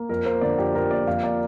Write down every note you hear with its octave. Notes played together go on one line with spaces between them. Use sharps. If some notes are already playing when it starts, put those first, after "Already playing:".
Already playing: A#3
F2 A#4
A#3 C5
D3 D5
F2 G4
F2 A#4
A#3 D5
F2 F5
A#3 D5